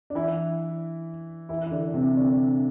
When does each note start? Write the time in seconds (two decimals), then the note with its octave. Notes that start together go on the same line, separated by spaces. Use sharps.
0.10 D4
0.15 E3 E4
1.49 E3 E4
1.66 E4
1.71 D3 D4
1.94 C3 C4
2.16 D3 D4